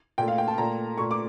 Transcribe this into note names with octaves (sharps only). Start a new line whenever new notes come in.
A#2 A3 G5
F5
G5
A5
A#2 A3 A#5
A#2 A3 C#6
D6